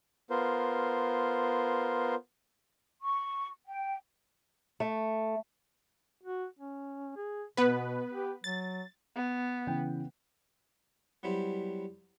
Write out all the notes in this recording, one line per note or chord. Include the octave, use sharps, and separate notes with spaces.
B3 F4 A#4 C5
C#6
G5
A3
F#4
C#4
G#4
B2 B3 B4
G4
F#3 A6
B3
C#3 E3 G5
F#3 G3 B3 E4 G4 C5